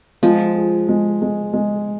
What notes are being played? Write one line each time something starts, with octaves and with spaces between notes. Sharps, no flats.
F3 G#3
G#4
G#3
G#3
G#3